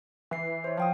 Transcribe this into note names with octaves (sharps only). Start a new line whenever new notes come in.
E3 B4 C7
C5 C#5
F3 F5 G5 D#6